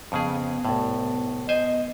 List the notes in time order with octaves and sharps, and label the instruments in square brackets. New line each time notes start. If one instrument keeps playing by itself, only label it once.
[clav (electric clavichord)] F2 C#3 G#4 [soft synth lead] B3
[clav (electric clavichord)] C2 A2
[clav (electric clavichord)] C5 G#5 [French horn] D#5